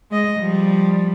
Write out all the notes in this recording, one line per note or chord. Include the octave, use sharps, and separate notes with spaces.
G#3 D#5
F3 G3